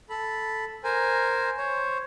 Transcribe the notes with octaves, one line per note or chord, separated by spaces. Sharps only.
A4 B5
A#4 C5 G#5
C5 C#5